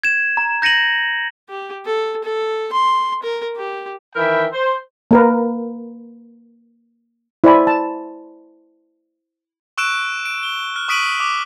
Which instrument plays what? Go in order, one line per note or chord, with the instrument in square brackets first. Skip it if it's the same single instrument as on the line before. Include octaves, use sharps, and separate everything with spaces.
[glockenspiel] G#6 E7
A#5
G6 A#6 C#7 D#7 F#7
[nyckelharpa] G4
A4
A4
C6
A#4
G4
[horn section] D#3 E3 A#4 E5 G5 B5
C5
[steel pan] A#3 A#4 B4
E4 C5 D5 G#5 B5
A5
[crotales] C#6 E6 F#6 D7 E7
D7
G7
F6
C#6 D#6 B6 D7 D#7 F#7
D6